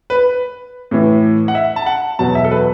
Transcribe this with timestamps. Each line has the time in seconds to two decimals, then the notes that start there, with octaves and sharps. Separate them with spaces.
0.10 B4
0.91 A2 E3
1.48 F#5
1.55 E5
1.76 A5
1.86 F#5
2.19 E2 B2 F#3 A5
2.35 E5
2.44 A4
2.51 B4